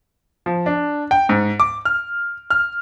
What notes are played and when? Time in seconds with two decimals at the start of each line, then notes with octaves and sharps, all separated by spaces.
0.46 F3
0.66 D4
1.11 G5
1.29 G#2
1.60 D6
1.85 F6
2.50 F6